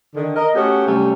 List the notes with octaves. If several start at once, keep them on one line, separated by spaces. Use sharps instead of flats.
D3 D#3
A#4 D#5
A3 B3 C#4 F#4 G4
C3 F#3 G3 A3 C#4